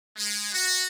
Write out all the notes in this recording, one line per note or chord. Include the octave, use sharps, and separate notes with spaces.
G#3
F#4